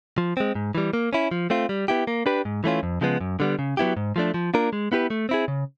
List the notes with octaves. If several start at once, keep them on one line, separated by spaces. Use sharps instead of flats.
F3
G#3 C4
G#2
E3 G3
A#3
C#4 E4
F3
A3 C4 F4
G3
B3 E4 G4
A#3
D4 G4 B4
G#2
E3 A3 C#4 F4
F2
C#3 F3 G#3 B3
F#2
D3 G3 B3
C#3
F#3 B3 E4 G4
G#2
F3 A3 D4
F3
A#3 D4 F4 A#4
G#3
B3 E4 G4 B4
A3
C4 E4 G#4
C#3